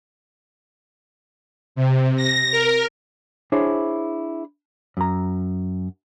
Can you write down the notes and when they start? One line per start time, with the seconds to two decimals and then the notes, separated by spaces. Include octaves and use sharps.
1.76 C3
2.16 A#6
2.52 A#4
3.52 D4 E4 G#4 C5 C#5
4.97 F#2 A#5